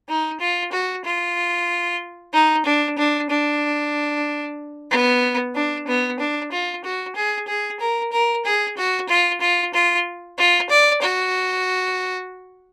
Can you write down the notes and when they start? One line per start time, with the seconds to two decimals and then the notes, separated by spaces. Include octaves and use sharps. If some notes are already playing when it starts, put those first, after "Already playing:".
0.09 D#4
0.40 F4
0.73 F#4
1.05 F4
2.33 D#4
2.66 D4
2.98 D4
3.30 D4
4.91 B3
5.55 D4
5.87 B3
6.20 D4
6.52 F4
6.84 F#4
7.16 G#4
7.48 G#4
7.80 A#4
8.12 A#4
8.45 G#4
8.77 F#4
9.09 F4
9.41 F4
9.74 F4
10.38 F4
10.70 D5
11.02 F#4